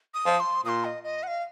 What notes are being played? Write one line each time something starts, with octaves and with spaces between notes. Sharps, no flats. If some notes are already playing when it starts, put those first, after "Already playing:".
D#6
F3
C6
A#2 C6 D#6
D#5
D#5
F#5
F5